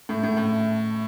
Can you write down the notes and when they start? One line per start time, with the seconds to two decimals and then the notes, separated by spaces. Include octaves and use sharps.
0.09 A2
0.23 A2
0.37 A2